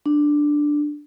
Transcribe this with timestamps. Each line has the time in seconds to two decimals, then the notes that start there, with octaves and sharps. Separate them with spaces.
0.06 D4